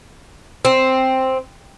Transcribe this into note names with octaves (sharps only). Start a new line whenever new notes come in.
C4